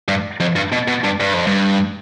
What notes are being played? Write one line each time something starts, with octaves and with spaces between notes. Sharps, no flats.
G2
F2
G2
B2
B2
G2
G2
F2
G2